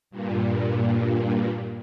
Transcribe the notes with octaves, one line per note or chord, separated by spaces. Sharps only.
G2 A#2